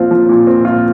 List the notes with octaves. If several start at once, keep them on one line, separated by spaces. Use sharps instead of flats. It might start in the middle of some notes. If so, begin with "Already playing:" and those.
Already playing: A#2 F3 C4 F4
F3
A#2
C4
F4